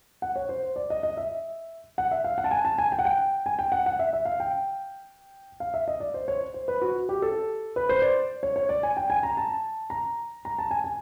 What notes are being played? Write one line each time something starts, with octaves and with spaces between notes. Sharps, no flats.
F#5
C#5
C5
D5
D#5
D#5
E5
F#5
E5
F5
F#5
A5
G#5
A5
G#5
G5
F#5
G5
G#5
G5
F#5
F#5
E5
E5
F5
G5
F5
E5
D#5
D5
C5
C#5
C5
B4
F#4
G4
A4
B4
C5
D5
C#5
C#5
D5
G#5
G5
G#5
A#5
A5
A#5
A#5
A5
G#5
G#5